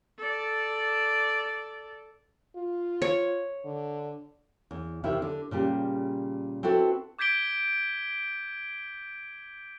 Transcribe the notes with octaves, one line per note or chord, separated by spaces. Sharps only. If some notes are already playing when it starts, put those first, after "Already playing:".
A4 D5
F4
C#5
D3
E2
E2 C3 D#3 E4 E5
D3
A#2 C#3 G3 G4
C4 E4 F#4 A4 B4
D6 G6 G#6 B6 D7 G7